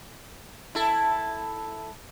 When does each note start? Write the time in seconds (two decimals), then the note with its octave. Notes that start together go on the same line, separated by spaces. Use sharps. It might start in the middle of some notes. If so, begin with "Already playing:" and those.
0.75 E4 A4